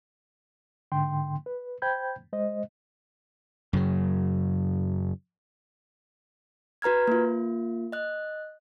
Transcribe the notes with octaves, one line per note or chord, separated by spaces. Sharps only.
G#2 D3 G5 C6
B4
C5 G5 B5 G6 G#6
G#3 C5 D#5
F#2 C#3 F#3
F#4 B4 A#5 F6 G#6
A#3 F4
D#5 F#6